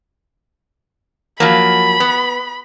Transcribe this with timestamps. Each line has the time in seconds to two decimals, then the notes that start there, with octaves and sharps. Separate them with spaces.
1.40 F3 F#3 A#3 B5
2.00 B3